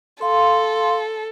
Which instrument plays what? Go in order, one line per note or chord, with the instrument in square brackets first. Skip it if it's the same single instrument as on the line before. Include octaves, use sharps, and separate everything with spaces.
[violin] A4 [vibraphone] F5 C6